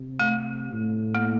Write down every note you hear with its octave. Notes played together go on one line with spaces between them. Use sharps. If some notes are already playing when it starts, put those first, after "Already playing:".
Already playing: C3
A3
A2
A#3